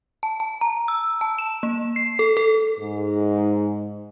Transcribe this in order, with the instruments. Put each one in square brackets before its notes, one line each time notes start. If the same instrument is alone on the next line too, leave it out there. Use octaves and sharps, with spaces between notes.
[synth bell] A5
A5
A#5
E6
A5
E7
A#3
C7
A4
A4
[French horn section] G#2